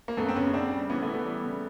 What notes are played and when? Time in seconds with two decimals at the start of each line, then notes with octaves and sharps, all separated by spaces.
0.08 A#3
0.17 F#2 A3 B3
0.29 C4
0.36 C#3 B3 C#4
0.53 C#3 C4 D4
0.72 G3
0.90 E3 B3 C#4
1.02 A3 B3
1.08 E3
1.14 A3 B3
1.26 G3
1.44 C#3